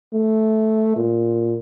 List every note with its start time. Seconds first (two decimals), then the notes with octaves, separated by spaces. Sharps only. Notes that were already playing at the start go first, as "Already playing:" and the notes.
0.14 A3
0.96 A#2